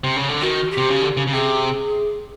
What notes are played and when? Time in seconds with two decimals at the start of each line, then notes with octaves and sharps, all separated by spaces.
0.04 C3
0.16 C#3
0.29 D3
0.41 D#3 F#4
0.71 G4
0.78 C3
0.90 C#3
1.02 D3
1.17 C#3
1.27 C#3
1.33 C3 G#4